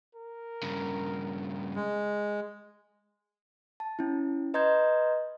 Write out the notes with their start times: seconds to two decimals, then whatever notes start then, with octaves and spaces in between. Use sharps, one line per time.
0.15 A#4
0.63 G2 C#3
1.76 G#3
3.80 A5
3.99 C#4 E4
4.54 B4 D#5 A#5 C6 G6 G#6